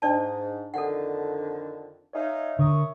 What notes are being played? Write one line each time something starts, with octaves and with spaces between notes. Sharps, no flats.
G#2 D4 D5 A5
F2 D3 D#3 A4 F#5
D#4 C#5 E5 F5 G#5
D3 A#4 C#6 D#6